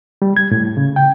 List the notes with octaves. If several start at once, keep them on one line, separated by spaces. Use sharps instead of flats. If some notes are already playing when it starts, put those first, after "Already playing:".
G3
G#6
A2
C#3
G5